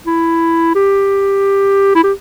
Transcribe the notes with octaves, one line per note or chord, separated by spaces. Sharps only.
E4
G4
E4
G4